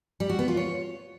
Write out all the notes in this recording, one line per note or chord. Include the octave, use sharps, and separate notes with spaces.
G3
F#4
B3
F4
C#5